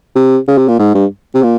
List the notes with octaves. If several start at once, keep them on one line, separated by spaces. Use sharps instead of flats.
C3
C#3
C3
A#2
G#2
G2
C3
A#2